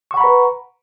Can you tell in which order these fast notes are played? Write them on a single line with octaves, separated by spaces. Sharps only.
C#6 F#5 B5 A#5 B4